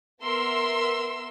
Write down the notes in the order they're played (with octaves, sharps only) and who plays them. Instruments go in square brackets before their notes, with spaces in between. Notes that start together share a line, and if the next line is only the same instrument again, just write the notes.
[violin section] B3 A#4 E5 C6 E6